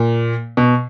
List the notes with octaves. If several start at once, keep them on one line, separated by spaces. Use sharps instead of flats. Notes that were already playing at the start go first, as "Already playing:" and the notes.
Already playing: A#2
B2